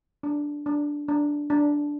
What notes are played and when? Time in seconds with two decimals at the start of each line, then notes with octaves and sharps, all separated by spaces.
0.23 D4
0.66 D4
1.08 D4
1.50 D4